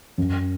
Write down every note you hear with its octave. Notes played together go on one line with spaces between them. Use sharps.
F#2